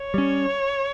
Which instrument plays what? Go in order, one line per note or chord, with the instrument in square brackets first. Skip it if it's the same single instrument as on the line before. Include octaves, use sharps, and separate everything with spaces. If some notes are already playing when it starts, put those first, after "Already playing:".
Already playing: [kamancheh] C#5
[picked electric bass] G3 C#4